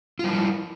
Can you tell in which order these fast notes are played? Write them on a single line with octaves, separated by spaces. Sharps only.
F4 G3 E4